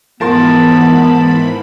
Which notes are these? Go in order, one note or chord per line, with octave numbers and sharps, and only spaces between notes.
G#2 E3 F3 B3 A#4 A5 B5 C6